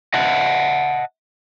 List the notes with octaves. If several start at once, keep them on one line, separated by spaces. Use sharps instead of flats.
D#5 E5 F#5 A5